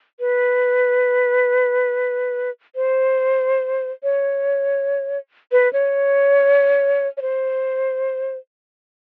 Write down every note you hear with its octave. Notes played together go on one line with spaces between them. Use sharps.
B4
C5
C#5
B4
C#5
C#5
C5